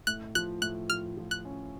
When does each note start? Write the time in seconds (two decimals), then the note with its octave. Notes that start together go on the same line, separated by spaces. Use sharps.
0.07 A2 F#6
0.35 F3 F#6
0.62 A2 F#6
0.90 F3 F6
1.17 F3
1.31 F#6
1.45 C#4